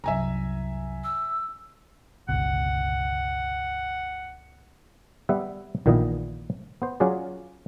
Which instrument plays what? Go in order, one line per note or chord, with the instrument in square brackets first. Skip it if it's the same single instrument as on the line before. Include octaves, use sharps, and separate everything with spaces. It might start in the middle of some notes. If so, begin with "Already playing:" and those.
[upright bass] C2 F#2 [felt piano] E5 G#5 A#5
[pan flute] E6
[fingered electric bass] G1 C#2 B2 [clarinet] F#5
[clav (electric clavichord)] G3 B3 B4 E5
A#1 A#2 D#3 E3 B3 D#5
B3 C5
F#3 C#4 F4 F#4 G#4 D5